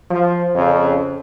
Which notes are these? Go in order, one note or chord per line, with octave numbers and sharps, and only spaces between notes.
F3
F2 C#3